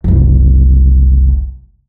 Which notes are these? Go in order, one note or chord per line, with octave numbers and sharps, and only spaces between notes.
F#1 C2